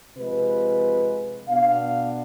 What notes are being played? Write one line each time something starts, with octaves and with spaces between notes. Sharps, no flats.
C3 F3 G#3 B4
B2 B3 D4 F5